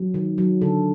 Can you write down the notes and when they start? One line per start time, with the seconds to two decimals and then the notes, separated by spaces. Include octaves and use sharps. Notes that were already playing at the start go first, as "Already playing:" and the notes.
Already playing: F#3
0.14 D#3
0.38 F#3
0.61 D3 A4